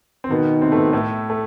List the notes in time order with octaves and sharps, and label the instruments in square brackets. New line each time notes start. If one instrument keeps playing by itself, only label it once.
[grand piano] C4
[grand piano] B2 B3 [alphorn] D#3
[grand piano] C3 C4
A3
B2 B3
A2 A3
A3